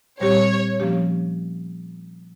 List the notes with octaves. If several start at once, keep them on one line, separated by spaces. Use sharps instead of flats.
A#2 G3 C4 G4 C#5
F3 A#3 C#4 G4